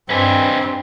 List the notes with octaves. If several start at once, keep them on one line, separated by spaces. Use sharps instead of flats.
G2 C4 B4 D#5 G#5